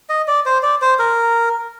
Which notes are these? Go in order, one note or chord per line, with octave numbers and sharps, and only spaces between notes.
D#5
D5
C5
D5
C5
A#4